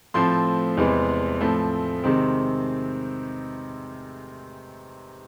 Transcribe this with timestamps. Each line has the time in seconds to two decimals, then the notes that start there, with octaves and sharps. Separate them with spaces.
0.14 A2 F3 A3 C4 C6
0.77 E2 C3 E3 G#3 C4
1.41 A2 F3 A3 C4
2.04 C3 D#3 G#3 C4